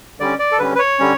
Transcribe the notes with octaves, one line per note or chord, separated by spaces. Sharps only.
D3 G3 C#4 D5
D5
A4
D3 G3 C#4 B4
B4
C#5
D3 G3 C#4